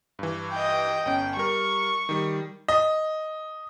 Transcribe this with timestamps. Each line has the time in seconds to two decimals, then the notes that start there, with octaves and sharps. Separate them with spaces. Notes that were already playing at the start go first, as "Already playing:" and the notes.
0.19 G2 E3
0.52 D#5 G5
1.06 G1 C#4 G5
1.37 G3 A#4 C#6
2.09 D#3 G3
2.68 D#5